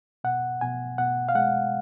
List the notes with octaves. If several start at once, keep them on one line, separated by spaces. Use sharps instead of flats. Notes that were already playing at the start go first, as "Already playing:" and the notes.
B2 F#5
B2 G#5
B2 F#5
F5
G#3 F#5